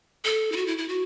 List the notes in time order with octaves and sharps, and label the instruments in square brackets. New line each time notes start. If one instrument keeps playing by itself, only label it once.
[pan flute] A4
E4
F#4
E4
E4
F#4